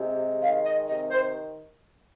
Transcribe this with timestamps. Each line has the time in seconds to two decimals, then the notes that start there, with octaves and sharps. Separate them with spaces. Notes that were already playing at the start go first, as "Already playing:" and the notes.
Already playing: C3 G#3
0.40 D#3 F5
0.64 D#5
0.87 C3 D#5
1.11 C5